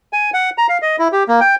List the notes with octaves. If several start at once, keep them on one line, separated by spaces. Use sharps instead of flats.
G#5
F#5
A#5
F5
D#5
E4
G4
A#3
G5